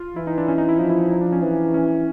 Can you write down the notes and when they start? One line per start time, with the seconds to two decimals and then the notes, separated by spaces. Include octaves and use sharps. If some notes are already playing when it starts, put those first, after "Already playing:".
Already playing: F4
0.16 E3 E4
0.27 D#4
0.38 D4
0.48 C#4
0.58 D#4
0.69 E4
0.79 F3 D#4
0.90 E4
1.11 D#4
1.21 D4
1.32 C#4
1.42 E3
1.74 C#4